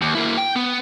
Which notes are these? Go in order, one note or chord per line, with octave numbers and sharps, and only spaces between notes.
D#2
A#3 E4
G5
B3